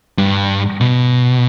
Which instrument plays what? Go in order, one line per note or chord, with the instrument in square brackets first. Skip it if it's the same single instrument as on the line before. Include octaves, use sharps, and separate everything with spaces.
[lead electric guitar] G2
B2